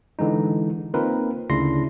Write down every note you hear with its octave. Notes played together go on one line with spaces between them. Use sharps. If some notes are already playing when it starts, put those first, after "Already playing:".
D3 E3 G#3 D#4
A#3 C4 D#4 F4 A#4 B4
D2 C#3 D4 E4 C6 A#6